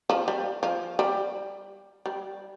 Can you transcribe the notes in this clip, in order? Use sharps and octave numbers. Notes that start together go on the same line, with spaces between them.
F3
G3
F3
G3
G3